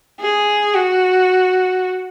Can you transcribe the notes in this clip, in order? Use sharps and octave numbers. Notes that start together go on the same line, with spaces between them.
G#4
F#4